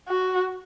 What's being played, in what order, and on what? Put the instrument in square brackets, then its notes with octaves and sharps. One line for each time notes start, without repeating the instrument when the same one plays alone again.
[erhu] F#4